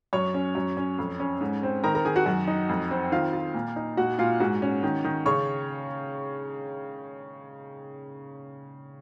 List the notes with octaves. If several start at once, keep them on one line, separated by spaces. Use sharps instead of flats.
F#2 C#5 C#6
C#4
F#2
C#4
F2
C#4
G#2
C4
D#3 A#4 A#5
A#4 A#5
D#3 G#4 G#5
F#4 F#5
F#2
D#4
F2
C4
D#3 F4 F5
F4
A#2
D#4
A#2 F#4 F#5
A#2 F4 F5
G#2 F#4 F#5
C#4
D#3
D#3
C#3 C#5 C#6